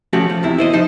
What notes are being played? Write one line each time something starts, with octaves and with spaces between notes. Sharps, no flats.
F3 A3 C#4 F#4 G4
F3
E2 C3 E4
E4 C5 D#5
F3 D#4 C5